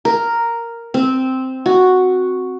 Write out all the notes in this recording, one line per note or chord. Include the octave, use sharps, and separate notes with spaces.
A#4
C4
F#4